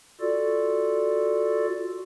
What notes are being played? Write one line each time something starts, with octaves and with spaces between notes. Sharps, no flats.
F4 F#4 A4 D5